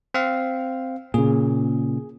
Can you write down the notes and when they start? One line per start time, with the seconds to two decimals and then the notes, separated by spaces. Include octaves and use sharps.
0.14 C4 F5
1.14 A#2 C#3 G#4